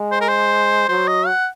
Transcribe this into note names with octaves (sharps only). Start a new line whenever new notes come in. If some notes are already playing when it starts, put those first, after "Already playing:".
Already playing: G#3
C5
A#4
C5
F#3 C5
D#5
F#5